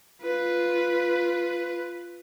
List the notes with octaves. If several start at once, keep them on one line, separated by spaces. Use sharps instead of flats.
F4 B4